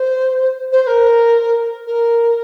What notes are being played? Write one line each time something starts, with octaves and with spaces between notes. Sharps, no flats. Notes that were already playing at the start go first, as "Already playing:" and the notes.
Already playing: C5
C5
C5
A#4
A#4